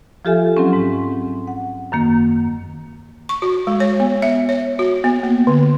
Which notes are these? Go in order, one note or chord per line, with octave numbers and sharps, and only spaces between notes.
F3 F4 G4 A4 E5 G#5
F#3 C4 C#4
G#2
F#5
F#2 D#3 A#3
C#6
F#4
G#3
C#5
B3
E5
C#5
F#4
B3
A#3
D3